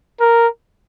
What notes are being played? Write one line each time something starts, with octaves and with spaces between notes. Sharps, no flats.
A#4